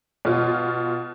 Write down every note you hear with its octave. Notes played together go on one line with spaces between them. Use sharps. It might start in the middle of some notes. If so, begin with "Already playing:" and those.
B2 F4